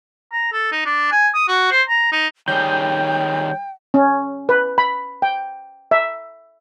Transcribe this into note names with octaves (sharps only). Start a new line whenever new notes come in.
A#5
A4
D#4
D4
G#5
D#6
F#4
C5
A#5
D#4
D#3 G3 G#4 C#5 G5 G6
C#4
B4
B5
G5
E5